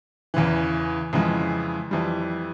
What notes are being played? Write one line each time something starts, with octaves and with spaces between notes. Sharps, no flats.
E2 C#3 E3
F2 C#3 E3 G#3
F2 E3 G3